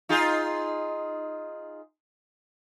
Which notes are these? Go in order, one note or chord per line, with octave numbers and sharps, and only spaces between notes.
D#4 F4 G#4